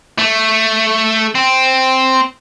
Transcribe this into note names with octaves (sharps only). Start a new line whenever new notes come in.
A3
C4